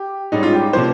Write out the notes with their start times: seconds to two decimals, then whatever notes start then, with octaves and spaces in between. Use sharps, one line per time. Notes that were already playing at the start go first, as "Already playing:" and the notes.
Already playing: G4
0.32 G#2 G3 C#4 D#4
0.43 F4
0.53 G4
0.73 C3 F3 A#3 C#4 C5